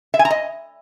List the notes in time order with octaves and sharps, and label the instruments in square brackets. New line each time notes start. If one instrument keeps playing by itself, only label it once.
[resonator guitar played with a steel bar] E5
G#5
A#5
D#5